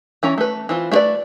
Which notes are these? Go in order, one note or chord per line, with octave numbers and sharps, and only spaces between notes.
E3 C#4 A#5
A3 B4
E3 C4 F4
A3 F4 G#4 B4 D5